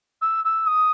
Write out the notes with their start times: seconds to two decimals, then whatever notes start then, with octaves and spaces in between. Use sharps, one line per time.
0.22 E6
0.45 E6
0.67 D#6